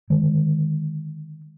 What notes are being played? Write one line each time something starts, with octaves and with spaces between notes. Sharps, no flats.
D3 D#3 G#3